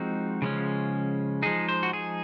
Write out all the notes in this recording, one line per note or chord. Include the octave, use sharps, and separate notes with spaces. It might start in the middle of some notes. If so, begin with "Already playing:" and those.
Already playing: F3 G#3 C4 D#4 F#4
C#3 F3 G#3 C#4
F3 G#3 D#4 G#4
C5
F#4
G#4